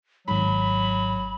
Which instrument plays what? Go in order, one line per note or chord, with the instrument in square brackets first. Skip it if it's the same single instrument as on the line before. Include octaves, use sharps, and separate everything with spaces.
[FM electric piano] G#1 G#2 [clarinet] F#3 [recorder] B5